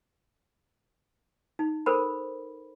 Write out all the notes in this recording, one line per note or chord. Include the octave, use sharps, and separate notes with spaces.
D#4
A4 A#4 C5 B5